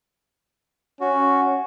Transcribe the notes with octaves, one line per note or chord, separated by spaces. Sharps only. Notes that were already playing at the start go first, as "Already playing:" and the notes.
C#4 F#4